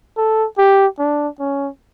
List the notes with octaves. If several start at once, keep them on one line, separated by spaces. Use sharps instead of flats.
A4
G4
D4
C#4